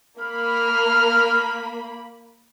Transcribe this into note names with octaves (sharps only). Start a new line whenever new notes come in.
A#3 B5 F6